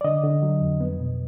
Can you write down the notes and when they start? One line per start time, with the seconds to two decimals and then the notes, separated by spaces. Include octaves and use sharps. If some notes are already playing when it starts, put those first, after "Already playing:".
0.01 D5
0.04 D3 D#5
0.24 D3
0.43 F#3
0.62 F2
0.81 B3
0.99 B2